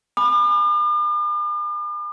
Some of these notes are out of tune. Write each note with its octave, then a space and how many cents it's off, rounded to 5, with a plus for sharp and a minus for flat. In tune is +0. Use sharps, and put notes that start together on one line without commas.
G#5 +0 B5 +0 D6 +45